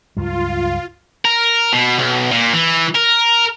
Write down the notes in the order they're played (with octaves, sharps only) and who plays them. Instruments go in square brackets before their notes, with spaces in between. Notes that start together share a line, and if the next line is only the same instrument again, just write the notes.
[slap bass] C#2 G2 F#3 [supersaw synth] F4
[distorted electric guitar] A#4
B2
B1
A#2
E3
A#4